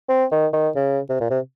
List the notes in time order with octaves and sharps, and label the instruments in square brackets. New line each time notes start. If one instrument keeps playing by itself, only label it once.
[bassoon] C4
D#3
D#3
C#3
C3
A#2
C3